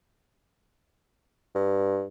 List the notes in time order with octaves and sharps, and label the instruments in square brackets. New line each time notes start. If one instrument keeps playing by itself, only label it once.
[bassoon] G2